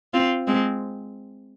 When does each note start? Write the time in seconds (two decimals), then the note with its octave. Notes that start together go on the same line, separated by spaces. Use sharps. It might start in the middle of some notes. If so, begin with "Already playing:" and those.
0.13 C4 F4
0.47 G#3 C4